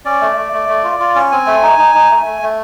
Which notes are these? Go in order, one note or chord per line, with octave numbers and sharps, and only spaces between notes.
C#4 D5
A3
A3
A3
A3
F4
F4
C#4
C4 G#5
A3
D#4
D#4
D#4
A3
A3
A3